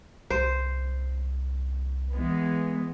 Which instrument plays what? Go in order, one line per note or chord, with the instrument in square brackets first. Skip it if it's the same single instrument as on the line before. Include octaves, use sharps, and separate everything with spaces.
[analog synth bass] C2 [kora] C5
[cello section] E3 G#3 B3